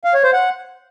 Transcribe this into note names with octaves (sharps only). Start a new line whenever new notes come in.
F5
C#5
C5
F#5